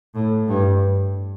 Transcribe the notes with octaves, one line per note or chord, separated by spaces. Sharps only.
A2
G2